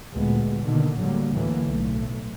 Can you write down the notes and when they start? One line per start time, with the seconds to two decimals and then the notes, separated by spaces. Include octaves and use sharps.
0.12 D2 A#2 G#3 B3
0.61 B2 D3 D#3 A#3
0.98 A2 D3 F#3 G3 A#3
1.33 D2 A2 D3 E3 F#3 A#3
1.65 B1 A2 A3